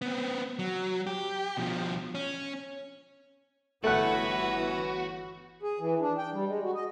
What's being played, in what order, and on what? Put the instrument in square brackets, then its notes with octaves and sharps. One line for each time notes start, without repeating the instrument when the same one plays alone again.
[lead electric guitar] B3 C4
F#3
G4
B2 F3
C#4
[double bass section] G1 E3 B3 [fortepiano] A3 F#5 [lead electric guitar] F#4 [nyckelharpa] B4 C#5
[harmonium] G#4
E3
D4
G5
G3
G#3
F#4
D#5